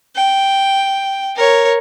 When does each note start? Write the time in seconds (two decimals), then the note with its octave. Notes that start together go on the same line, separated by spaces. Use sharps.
0.16 G5
1.36 A#4 C#5